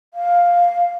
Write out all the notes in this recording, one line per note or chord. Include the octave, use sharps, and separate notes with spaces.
F5